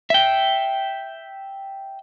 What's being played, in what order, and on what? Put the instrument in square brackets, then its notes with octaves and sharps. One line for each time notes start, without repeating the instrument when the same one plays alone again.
[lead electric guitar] E5 G5